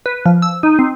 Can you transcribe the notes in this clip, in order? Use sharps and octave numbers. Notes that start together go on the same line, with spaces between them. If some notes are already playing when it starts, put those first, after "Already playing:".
B4
F3
E6
D#4
C4